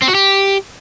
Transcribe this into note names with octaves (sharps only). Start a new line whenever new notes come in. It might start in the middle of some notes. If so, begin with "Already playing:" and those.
C4
F#4
G4